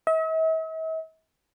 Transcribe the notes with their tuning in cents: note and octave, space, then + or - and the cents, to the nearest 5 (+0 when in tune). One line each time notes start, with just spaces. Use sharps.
E5 -45